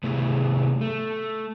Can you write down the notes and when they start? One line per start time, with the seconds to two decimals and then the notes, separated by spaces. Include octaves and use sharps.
0.04 C3 A3 B3 E4 G4 G#4
0.81 A3